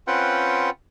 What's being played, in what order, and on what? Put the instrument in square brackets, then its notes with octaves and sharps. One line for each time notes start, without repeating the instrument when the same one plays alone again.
[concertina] C4 C#4 F4 B4 F#5 G5